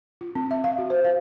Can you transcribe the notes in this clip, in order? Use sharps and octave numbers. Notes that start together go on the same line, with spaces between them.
F4
C4
E5
F5
F#4
C5
F5